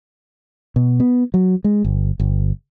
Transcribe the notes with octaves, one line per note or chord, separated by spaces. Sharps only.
B2
B3
F#3
G#3
G1
G1